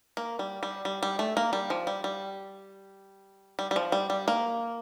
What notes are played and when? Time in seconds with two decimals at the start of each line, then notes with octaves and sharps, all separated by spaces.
0.17 A#3
0.39 G3
0.63 G3
0.85 G3
1.03 G3
1.19 A3
1.37 A#3
1.53 G3
1.70 F3
1.87 G3
2.04 G3
3.59 G3
3.71 G3
3.76 F3
3.92 G3
4.10 G3
4.28 A#3